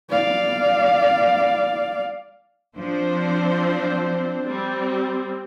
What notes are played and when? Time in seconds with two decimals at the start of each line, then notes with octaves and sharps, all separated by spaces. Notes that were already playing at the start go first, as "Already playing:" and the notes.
0.10 D5 F5
2.78 F3 C4 D4 C5
4.47 G3 C4